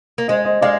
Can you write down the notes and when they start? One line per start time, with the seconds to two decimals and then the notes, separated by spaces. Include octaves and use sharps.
0.18 A#3
0.28 G#3 C5 D#5
0.45 C5 D#5
0.61 G#3 D5 F5